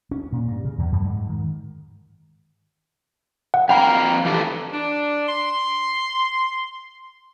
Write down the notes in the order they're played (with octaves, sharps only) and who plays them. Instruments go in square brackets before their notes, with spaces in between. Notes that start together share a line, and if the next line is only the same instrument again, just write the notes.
[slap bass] C#4
A#2
G2
C#3
E2
F#2
G#2
D#3
[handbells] F#5
[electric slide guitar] F2 F5 A#5 [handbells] G5 B5
[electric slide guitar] E3 G4 A4
[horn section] D4
C6